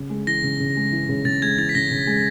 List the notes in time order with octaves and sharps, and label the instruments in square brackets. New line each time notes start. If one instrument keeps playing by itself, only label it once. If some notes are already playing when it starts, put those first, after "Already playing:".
Already playing: [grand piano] C#3
G#3
[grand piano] E3 [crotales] A#6
[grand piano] C#3
C#3
G#3
E3
C#3
[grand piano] C#3 [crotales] A6
[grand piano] G#3 [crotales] G#6
[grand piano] E3 [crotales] A6
[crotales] B6
[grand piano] C#3 [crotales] A#6
[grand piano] C#3
G#3